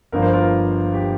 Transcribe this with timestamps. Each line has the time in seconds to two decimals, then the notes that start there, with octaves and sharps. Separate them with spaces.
0.12 G1 G2 F3 A#3 A#4
0.22 C5
0.33 F4 A#4
0.94 G4